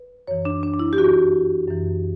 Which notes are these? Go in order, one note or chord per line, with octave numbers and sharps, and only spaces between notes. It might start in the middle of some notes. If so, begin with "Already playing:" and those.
Already playing: B4
F#2 E3 C#5
D4
D4
D4
E4
G4
G2 E3 F#4
F#2 E3